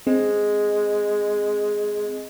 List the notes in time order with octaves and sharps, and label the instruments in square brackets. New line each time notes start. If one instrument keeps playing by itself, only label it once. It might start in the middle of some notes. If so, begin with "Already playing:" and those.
[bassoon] G#3 [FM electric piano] C4